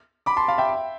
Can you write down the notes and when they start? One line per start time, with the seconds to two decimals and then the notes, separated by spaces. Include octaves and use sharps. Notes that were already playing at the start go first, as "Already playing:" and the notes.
0.26 B5 D6
0.37 A5 C6
0.48 F5 A5
0.58 E5 G5